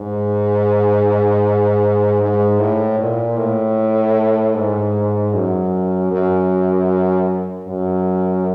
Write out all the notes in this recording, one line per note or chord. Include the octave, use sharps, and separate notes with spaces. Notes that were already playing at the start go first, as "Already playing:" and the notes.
Already playing: G#2
G#2
A2
A#2
A2
G#2
F#2
F#2
F#2